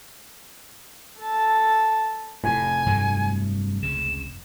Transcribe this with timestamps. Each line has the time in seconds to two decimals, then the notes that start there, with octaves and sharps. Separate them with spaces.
1.20 A4 A5
2.44 F1 A2 G#5
2.86 G2 F#3 A3
3.83 C#2 C#3 E7